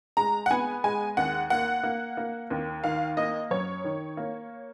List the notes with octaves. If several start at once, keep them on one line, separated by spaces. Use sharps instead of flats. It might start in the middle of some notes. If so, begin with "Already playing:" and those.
G#3 A#5
F#5
B3 G#5
G#3 G#5
D#2 F#5
A#3 F#5
A#3
A#3
D#2
D#3 F5
A#3 D#5
F#2 C#5
D#3
A#3